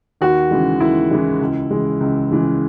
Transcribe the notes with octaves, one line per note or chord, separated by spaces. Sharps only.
D#2 F#4
C#3 E3 G#3
D#2 E4
C#3 E3 G#3
C#2
C#3 E3 G#3
C#2
C#3 E3 G#3